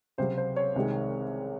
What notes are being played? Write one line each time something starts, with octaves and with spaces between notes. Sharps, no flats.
C#2 C3 F#3 C5
C5
C#5
C2 C3 D#3 G#3